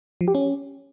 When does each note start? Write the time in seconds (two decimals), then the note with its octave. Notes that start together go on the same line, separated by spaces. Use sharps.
0.21 F3
0.28 G4
0.35 C#4